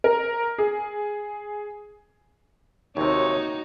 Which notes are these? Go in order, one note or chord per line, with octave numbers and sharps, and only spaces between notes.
A#4
G#4
D#2 C3 D#4 F#4 C#5